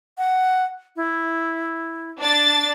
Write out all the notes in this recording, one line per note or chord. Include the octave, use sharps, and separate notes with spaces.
F#5
E4
D4 A6